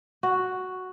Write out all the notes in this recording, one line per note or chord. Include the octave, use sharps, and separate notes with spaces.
F#4